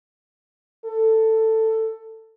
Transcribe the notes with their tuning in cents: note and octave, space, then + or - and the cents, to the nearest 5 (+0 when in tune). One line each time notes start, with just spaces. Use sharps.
A4 +10